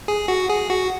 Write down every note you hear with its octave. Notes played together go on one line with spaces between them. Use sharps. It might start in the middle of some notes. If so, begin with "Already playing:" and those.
G#4
F#4
G#4
F#4